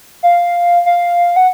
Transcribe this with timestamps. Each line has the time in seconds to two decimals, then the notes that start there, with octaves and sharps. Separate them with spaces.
0.23 F5
0.86 F5
1.36 F#5